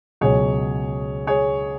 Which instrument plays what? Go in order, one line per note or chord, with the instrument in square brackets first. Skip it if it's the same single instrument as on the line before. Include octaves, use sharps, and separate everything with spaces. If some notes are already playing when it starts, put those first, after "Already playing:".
[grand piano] C#2 B2 F#3 G#4 C#5
G#4 C#5